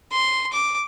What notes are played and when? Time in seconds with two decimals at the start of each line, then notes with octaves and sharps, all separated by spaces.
0.12 C6
0.53 D6